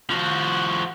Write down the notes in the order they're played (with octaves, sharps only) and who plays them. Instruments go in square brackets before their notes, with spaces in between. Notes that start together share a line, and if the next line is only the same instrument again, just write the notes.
[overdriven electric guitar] F3 F#4